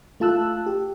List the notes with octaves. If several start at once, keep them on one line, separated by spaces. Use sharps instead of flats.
A3 F4 A5 E6 F#6
G4